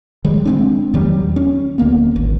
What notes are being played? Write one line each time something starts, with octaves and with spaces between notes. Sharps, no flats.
D#3 G3 G#3
G#3 C4 D4
E2 D#3 F#3 G3
C#4
D1 D2 A#3 B3
G#1